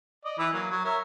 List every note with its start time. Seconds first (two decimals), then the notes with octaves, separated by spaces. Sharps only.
0.25 D5 D#5
0.39 E3 B4 E6
0.53 F#3 A#3
0.71 F#3
0.84 A#4 C#5 E5